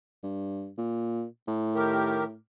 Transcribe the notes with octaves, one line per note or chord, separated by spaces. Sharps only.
G2
A#2
A2
D#3 G4 A#4